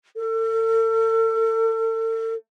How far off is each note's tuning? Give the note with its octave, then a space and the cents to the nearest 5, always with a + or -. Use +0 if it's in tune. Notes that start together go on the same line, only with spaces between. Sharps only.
A4 +40